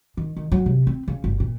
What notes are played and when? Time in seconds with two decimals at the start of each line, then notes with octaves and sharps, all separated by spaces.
0.17 D#3
0.37 D#3
0.52 F#3
0.66 C3
0.87 C4
1.08 C#3
1.24 G1
1.40 A#2